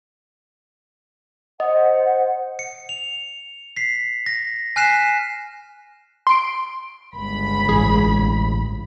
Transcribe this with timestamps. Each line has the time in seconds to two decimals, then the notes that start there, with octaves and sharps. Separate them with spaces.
1.60 C5 D#5 F#5
2.59 C#7
2.89 F7
3.77 B6 C7
4.26 A#6
4.76 G#5 F6 F#6 B6 C7 E7
6.27 C6 D7
7.16 G1 C#2 B5
7.69 A1 G#4